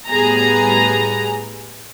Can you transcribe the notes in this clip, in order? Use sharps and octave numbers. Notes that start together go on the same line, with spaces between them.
A2 G3 B3 G#4 A#5